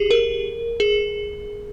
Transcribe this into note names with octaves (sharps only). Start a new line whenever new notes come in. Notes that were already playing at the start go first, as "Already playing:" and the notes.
Already playing: G4 G#4
A#4
G#4